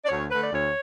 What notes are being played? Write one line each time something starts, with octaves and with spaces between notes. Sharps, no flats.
D5
D2 C#5
D3 A3 B4
D5
D2 C#5